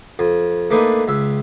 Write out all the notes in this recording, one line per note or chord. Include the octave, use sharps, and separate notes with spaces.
F2
A3 A#3 D4 D#4 B4 G#5
C#2 E5